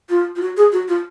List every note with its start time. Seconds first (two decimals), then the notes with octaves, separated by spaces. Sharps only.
0.09 F4
0.36 F4
0.41 F#4
0.57 G#4
0.72 F#4
0.88 F4